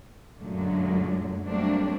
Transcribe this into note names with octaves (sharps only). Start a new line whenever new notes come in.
F#2 A#2 D3 F#3 G#3 A3
F#3 G3 A3 A#3 C4 D4